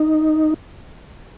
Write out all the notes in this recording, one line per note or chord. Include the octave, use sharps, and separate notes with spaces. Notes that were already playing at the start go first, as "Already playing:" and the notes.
Already playing: D#4